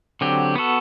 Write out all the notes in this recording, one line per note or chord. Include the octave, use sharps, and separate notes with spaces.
D3 F#3 C4 G4
B3 F#4 A4